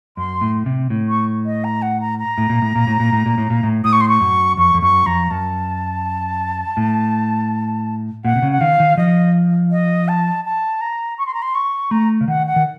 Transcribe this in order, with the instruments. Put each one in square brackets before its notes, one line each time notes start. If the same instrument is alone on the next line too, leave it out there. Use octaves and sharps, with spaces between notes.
[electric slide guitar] F#2 [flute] C6
[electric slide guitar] A2
C3
A2
[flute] C#6
D#5
A#5
F#5
A#5
A#5
[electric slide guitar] A2
A#2
A2
A#2
A2
A#2
A2
A#2
A2
A#2
A2
[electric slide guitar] A2 [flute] D#6
[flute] C#6
C6
C#6
[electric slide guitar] F#2
[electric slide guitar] F2 [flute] C#6
[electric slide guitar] F2
[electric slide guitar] F#2 [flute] C#6
[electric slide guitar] F2 [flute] A#5
[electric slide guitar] F#2 [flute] A5
[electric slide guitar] A2
[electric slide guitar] A#2 [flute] F#5
[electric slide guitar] C3
C#3
[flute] F#5
[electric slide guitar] D#3 [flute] F5
[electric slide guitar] D#3
[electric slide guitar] F3 [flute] D#5
[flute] D#5
A5
A5
A#5
C#6
C6
A#5
C6
C#6
[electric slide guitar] A3 [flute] A#5
[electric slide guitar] C#3
[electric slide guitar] D#3 [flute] F#5
[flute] F#5
[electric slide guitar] D#3